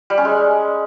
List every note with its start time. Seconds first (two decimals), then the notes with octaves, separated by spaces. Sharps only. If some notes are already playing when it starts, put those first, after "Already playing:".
0.10 G3
0.18 C#4
0.25 G#3